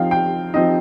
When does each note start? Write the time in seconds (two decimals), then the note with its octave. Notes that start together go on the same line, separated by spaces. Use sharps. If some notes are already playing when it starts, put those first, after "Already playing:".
Already playing: F3 C4 D#4 F5 G5
0.11 G5
0.54 F3 C4 D#4 D#5